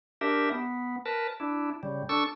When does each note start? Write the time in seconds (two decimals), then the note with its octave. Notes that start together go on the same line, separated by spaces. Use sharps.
0.21 D4 G4 A#4 E5
0.51 B3
1.06 A#4 B4 A5
1.40 D4 E4
1.83 C#3 G3
2.09 D4 A4 C#6 E6